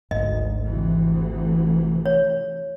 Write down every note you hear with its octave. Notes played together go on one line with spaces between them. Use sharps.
G#1 D2 D#5
D2 C3 E3
C#5